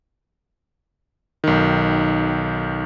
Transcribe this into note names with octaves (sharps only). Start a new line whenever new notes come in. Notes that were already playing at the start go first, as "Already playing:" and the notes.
B1 D#3